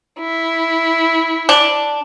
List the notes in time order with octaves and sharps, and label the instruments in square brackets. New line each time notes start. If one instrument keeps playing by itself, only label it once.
[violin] E4
[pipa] D4